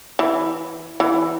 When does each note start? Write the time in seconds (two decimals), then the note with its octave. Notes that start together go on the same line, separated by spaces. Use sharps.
0.19 E3
1.00 E3